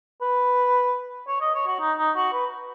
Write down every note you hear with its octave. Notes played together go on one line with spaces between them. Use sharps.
B4
C#5
D#5
C#5
F#4
D#4
D#4
F#4
B4